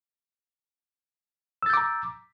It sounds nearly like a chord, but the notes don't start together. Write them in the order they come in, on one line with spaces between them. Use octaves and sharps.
E6 A6 G6 D6 A#5